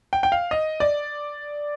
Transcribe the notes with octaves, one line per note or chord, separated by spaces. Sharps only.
G5
G5
F5
D#5
D5